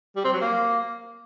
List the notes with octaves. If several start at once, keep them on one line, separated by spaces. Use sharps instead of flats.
G3
C4
F#3
A#3